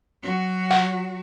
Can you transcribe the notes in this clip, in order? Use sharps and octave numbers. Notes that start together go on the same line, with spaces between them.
F#3 F#4
F#5